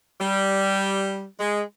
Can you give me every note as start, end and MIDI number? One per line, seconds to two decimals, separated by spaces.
0.21 1.26 55
1.40 1.61 56